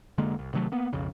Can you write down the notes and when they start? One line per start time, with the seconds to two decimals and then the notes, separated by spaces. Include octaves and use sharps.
0.18 F1 D3 G#3 A#3
0.39 C2
0.53 C3 D#3 F#3 A3
0.72 A#3 B3
0.93 B1 F2 C#3